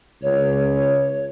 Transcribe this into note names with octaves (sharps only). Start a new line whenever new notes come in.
C#2 C#5